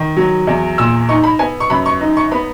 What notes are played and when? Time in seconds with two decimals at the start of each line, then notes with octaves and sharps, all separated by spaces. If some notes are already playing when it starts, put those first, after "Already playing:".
Already playing: D#3
0.17 F#3
0.47 E2
0.78 A#2 E6
1.09 D#4 C#6
1.24 B5
1.39 B3 G#5
1.60 C#6
1.70 F#2 B5
1.86 C#6
2.01 D#4
2.17 C#6
2.31 B3 B5